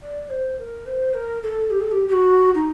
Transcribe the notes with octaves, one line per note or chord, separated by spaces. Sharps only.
D5
C5
A#4
C5
A#4
A4
G4
A4
G4
G4
F#4
D#4